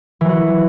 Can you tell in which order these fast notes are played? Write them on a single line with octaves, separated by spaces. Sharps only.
E3 F#3 F#4